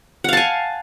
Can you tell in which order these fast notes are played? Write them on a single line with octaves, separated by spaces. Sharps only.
F#5 F5 A5 G#5